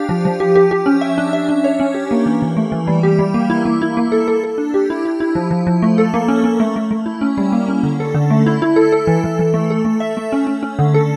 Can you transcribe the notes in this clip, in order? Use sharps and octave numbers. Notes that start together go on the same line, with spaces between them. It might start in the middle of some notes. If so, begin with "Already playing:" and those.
Already playing: D4 G4 F5
F3
F3
G4
G4
G4
C#4
E5
D4
E5
D4
C#5
C#4
G4
A#3
E3
E3
A3
E3
G3
G4
G3
A#3
E4
A#3
E4
A#3
A4
A4
A4
D4
G4
E4
E4
E4
F3
F3
F3
A3
A4
A#3
C#4
C#4
A3
A3
A3
E4
C#4
G3
A#3
C#4
D3
A4
D3
A3
E4
E4
A4
A4
E3
E3
E3
A3
A4
A3
E5
A3
C#4
C#4
C#4
D3
A4